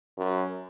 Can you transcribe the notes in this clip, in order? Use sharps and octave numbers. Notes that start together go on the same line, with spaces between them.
F#2